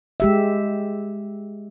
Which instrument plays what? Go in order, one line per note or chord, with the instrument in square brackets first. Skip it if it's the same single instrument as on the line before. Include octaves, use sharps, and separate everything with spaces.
[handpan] G#3 G4 E5